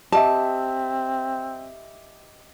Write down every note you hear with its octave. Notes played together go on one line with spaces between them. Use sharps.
C4 G4 D#5 E5 A5